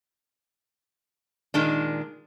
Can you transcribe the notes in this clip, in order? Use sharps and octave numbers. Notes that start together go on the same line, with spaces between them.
A#2 D#3 G#3 D4